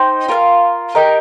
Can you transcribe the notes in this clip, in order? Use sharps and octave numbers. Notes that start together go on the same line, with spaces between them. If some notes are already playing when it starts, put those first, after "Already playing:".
Already playing: D#4 C5 G5
F4 A#4 F5
D#4 G4 A#4